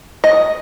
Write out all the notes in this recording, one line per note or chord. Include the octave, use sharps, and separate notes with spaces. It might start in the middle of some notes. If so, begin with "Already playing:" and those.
D#5